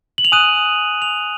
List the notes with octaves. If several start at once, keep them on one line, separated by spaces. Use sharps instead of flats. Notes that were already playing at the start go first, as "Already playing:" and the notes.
F#7
F7
G#5 D#6 F#6 D#7
F7